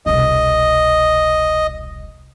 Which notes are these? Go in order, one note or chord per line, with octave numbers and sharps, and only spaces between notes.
E1 C2 D#5